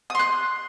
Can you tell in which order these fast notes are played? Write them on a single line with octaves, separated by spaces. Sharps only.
D#6 C6 F#6